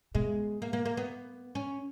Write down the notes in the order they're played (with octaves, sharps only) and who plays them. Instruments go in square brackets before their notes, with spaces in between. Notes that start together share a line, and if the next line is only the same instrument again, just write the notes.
[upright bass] B2 [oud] G#3
[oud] A#3
A#3
A#3
B3
C#4